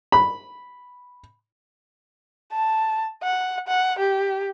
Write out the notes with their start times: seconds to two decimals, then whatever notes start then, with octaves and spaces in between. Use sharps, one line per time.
0.12 B5
2.53 A5
3.23 F#5
3.68 F#5
3.99 G4